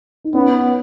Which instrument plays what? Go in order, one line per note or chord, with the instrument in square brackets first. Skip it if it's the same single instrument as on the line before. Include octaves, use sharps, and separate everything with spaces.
[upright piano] D#4
[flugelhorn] B3 [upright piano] C#4